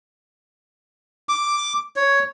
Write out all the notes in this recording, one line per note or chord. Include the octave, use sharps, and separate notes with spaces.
D6
C#5